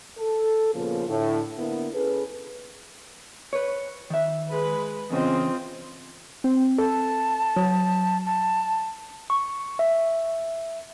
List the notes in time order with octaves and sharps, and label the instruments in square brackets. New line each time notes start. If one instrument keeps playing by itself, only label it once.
[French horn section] A4
A#2 C#3 F3 A#3 B3 F4
A2 D3
D3 A#3 B3 E4
C#4 G#4 A4 B4
[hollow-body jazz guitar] B4 C#5
D#3 E5
[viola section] G#3 B4 B5
[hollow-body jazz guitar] E2 C#3 [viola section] C4 F4 D#5
[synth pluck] C4
[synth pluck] A4 [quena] A5
[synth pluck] F#3
[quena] A5
[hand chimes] C#6
E5